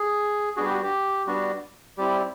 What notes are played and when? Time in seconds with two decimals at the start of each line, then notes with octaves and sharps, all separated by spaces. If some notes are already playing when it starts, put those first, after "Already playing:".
Already playing: G#4
0.56 G3 B3 D4 F#4 G#4
0.65 G4
0.74 F#4
0.83 G4
1.27 G3 B3 D4 F#4
1.98 G3 C4 E4 G4